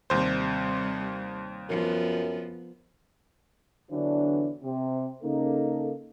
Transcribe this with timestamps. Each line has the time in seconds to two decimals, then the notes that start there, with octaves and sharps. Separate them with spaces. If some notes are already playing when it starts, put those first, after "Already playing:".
0.10 D#2 C3 G3 C5
1.69 F#2 F3 B3
3.91 E2 D3 E3 F#3 D4
4.63 C3
5.23 C#3 A#3 D#4 A4